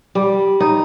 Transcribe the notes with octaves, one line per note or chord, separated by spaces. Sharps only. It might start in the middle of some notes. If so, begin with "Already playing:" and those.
G3
D#4